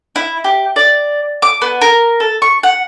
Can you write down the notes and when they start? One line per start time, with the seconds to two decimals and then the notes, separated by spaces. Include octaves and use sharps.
0.16 E4
0.44 G4
0.76 D5
1.42 D6
1.62 B3
1.81 A#4
2.20 A4
2.42 C#6
2.63 F#5